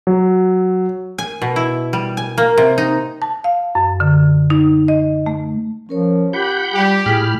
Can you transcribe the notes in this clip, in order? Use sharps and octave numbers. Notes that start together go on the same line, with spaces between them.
F#3
G#5
B2
E4
G3
G#5
A#3
C3
D#4
A5
F5
F#2
D3
D#4
D#5
A3
F3 C#4 A#4 C#5
F4 G4 F#5 B5 G6
G3 G4
A2 G#4 B5 F6